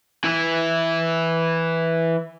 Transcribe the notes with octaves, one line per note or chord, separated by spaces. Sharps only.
E3 E4